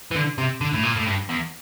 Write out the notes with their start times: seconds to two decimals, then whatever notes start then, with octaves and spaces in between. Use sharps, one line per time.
0.11 E3
0.15 D3
0.38 C3
0.61 D3
0.73 A2
0.83 A#2
0.96 A2
1.06 G2
1.29 E2